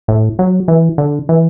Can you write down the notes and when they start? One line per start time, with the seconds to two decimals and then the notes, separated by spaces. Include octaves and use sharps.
0.08 A2
0.39 F#3
0.68 E3
0.98 D3
1.29 E3